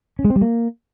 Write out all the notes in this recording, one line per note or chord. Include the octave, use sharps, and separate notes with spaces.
C#4
G#3
C4
G3
A#3